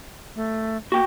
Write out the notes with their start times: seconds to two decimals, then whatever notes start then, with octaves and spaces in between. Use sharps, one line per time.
0.36 A3
0.92 A#3 F#4 G5